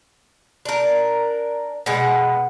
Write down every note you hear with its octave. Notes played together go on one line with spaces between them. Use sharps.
D4 A#4
B2 G#3 F#5